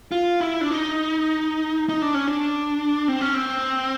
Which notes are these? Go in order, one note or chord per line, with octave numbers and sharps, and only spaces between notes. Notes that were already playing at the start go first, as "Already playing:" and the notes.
F4
E4
D4
D#4
D#4
D4
C#4
D4
C4
C#4
C4